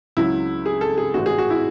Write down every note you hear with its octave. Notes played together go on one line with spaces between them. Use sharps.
C#2 C#3 F#3 E4
G#4
A4
G#4
A1 A2 E3 G#3 F#4
G#4
F#4
E4